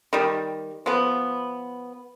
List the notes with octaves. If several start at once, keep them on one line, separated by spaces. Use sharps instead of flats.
D#3 G3
F3 B3